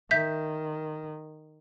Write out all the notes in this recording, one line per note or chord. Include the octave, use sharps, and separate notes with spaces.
D#3 E5 G6 B6